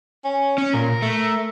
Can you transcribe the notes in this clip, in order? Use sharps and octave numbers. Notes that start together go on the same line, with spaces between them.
C#4
C#4
A#2 A#4
A3